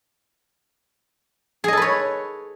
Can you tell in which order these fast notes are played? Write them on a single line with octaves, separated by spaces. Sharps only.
G#4 D#5 A4 B4 C#5